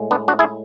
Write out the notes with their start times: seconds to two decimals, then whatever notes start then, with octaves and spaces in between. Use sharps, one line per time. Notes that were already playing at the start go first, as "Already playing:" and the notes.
Already playing: A2 G#3
0.11 B3 D4
0.28 D4 F#4
0.39 E4 G#4